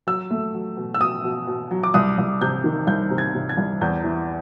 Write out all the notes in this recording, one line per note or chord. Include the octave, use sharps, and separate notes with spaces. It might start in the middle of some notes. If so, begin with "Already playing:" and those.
F#3 E6
A3
F#3
B2
E6
B2 D#6
B2
B2
F#3
D6
C2 D#6
C2
C3 G6
D#3
C2 G6
C3
G#6
C3
G#6
C2
E2 G6
E3